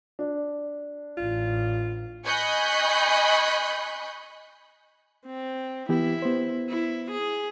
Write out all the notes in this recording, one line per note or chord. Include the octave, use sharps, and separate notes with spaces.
D4
A1 F4
D#5 G#5 B5 C#6 F#6 G6
C4
E3 B3 E4 G4
B3 C5
E4
G#4